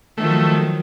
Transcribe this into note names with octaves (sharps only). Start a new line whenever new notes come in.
D#3 F3 F#3 A3